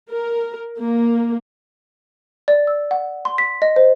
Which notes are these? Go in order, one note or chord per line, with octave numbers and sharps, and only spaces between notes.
A#4
A#3
D5
E6
F#5
C6
B6
D#5
C5